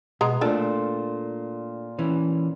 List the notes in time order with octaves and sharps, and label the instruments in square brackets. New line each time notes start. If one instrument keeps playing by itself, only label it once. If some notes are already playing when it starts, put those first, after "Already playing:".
[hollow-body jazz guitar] B2 [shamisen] G#3 B3 A#5
[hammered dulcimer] A#2 F4 C5 [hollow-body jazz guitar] A3 D4 [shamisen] A4 A#4
[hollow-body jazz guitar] E3 C#4